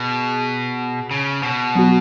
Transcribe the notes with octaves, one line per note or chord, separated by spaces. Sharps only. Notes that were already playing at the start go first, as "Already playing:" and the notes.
Already playing: B2 G#4
C#3
B2
F#3 B3 F#4